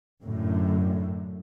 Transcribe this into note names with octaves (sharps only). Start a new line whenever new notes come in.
F#2 A2 D3